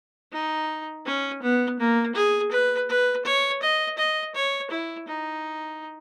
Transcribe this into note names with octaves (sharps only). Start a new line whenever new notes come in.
D#4
C#4
B3
A#3
G#4
B4
B4
C#5
D#5
D#5
C#5
E4
D#4